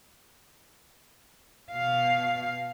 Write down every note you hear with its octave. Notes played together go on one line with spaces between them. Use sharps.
B2 F5